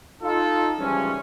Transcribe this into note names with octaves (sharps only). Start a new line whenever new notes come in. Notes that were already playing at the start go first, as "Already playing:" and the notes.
D#4 F4 A4
C#3 E3 F3 G3 G#3 C#4